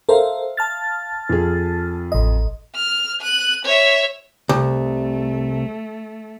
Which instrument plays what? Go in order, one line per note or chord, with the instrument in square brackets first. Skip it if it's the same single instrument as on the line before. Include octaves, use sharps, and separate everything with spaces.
[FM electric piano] A4 A#4 C5 [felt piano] E5 F5
[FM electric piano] A5 F6 A6
[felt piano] F2 G#4
[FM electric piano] A1 D#5
[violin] F6
F#6 D#7
C#5 E5
[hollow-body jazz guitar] C2 [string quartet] A3